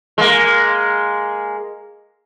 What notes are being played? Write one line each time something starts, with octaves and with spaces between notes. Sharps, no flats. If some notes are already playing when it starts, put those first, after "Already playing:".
G#3 A#3